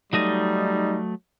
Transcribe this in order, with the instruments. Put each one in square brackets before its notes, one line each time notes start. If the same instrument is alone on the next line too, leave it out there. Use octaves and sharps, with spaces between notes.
[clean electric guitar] F#3 A3 D#5 [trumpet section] G3 D#4